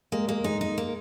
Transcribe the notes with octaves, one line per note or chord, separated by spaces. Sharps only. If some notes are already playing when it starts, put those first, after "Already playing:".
G#3 A#3
G#3 A#3
G#3 D#4
D#4
A#3